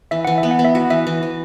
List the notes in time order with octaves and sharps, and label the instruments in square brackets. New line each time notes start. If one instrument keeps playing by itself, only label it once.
[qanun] E3 [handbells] E5
[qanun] E3 [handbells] F#5
[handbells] E5
[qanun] B3
[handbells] F#5
[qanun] B3
[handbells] E5
[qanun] F#4 [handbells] F#5
[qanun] E3 [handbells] E5
[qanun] E3
E3